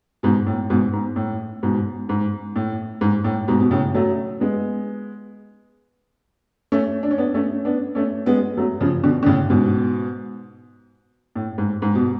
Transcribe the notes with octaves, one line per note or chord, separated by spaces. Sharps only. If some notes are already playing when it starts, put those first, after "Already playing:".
G#2 B2
A2
G#2 B2
G#2
A2
G#2 B2
G#2
A2
G#2
A2
G#2 B2
B2
A2 C#3
F#3 A3
G#3 B3
A3 C#4
D4
C#4
B3 D4
A3 C#4
B3 D4
A3 C#4
G#3 B3
F#3 A3
C#3 F3
B2 D3
D3
A2 C#3
G#2 B2
A2
G#2
G#2
B2